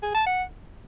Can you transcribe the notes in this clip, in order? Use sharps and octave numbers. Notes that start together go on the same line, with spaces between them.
G#4
A5
F#5